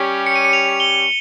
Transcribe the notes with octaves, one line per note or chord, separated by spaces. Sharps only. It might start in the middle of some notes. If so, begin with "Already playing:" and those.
Already playing: G3 C#4 G4 C#5
C#7
D#7
C#7
F7
G7